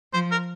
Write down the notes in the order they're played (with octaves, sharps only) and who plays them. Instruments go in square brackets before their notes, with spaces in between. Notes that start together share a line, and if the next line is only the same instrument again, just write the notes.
[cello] F3 [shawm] C5
[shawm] A#4